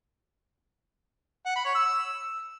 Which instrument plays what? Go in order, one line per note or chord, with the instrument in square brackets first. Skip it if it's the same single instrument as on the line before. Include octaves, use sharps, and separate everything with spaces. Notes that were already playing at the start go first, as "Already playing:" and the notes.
[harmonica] F#5
B5
C#5
E6